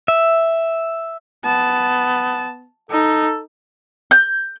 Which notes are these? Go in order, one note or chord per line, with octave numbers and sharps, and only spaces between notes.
E5
B3 A5
D#4 A4
G6